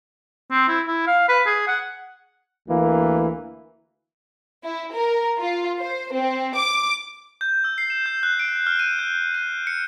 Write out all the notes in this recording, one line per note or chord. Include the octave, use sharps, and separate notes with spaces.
C4
E4
E4
F5
B4
G#4
F#5
D2 E3 A#3
E4
A#4
F4
C5
C4
D6
G6
E6
C7
E7
G6
F#6
D7
F6
D#7
G6
D#7
C#7